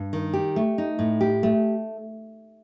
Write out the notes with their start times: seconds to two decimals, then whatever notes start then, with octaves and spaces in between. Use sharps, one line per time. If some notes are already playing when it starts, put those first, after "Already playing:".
Already playing: G2
0.13 D#3
0.33 G4
0.56 A3
0.78 D#4
0.99 A2
1.21 G4
1.43 A3